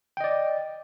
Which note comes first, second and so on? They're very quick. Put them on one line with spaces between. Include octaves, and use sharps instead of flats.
G5 D#5 D5